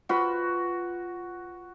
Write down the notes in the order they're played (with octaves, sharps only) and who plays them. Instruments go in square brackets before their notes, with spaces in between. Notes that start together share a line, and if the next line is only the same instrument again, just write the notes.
[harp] F4 B4 B5 [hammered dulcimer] F#4